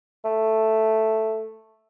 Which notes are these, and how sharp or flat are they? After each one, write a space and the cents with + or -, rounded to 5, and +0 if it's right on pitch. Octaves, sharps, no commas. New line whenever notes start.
A3 +0